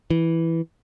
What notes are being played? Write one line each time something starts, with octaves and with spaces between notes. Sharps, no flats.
E3